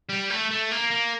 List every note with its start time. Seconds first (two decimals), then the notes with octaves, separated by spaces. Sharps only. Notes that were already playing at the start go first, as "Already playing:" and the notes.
0.09 G3
0.30 A3
0.51 A3
0.71 A#3
0.91 A#3